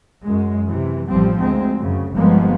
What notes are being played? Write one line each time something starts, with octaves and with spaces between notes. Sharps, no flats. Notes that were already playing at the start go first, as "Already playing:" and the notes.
F#2 G#3
C3 E3
A1 F3 G3 C4
D2 G#3 C4
F#2 C#3
G1 F3 G#3 A#3 B3